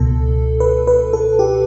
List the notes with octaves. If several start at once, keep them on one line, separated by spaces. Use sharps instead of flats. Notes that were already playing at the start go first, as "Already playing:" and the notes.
Already playing: C#2 B2 A4
B4
B4
A4
G4